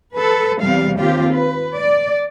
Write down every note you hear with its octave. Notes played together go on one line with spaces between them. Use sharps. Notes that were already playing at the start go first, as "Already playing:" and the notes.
A4 B4
E2 C3 G3 F5
D#2 C4 F4 G4
B4
D5